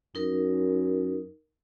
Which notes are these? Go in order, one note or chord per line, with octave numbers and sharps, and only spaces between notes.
F#2 D#4 A#4